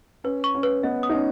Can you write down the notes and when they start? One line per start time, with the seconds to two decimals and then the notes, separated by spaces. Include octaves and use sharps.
0.24 C#4 B4
0.44 C#6
0.55 C#4
0.63 B4
0.83 B3 D#5
1.03 D#6
1.09 D#4
1.13 C#4